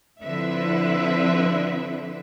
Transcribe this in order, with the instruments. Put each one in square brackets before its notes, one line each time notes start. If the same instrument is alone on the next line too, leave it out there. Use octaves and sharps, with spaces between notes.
[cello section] D3 F3 C4 E4 B4 E5